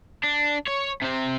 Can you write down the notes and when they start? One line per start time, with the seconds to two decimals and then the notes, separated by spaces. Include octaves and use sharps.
0.24 D4
0.68 C#5
1.02 C3 C4